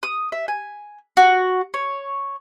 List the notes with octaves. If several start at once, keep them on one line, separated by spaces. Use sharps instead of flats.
D#6
E5
G#5
F#4
C#5